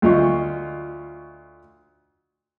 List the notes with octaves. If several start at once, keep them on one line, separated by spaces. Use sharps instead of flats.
D2 F3 F4 D#5 C#6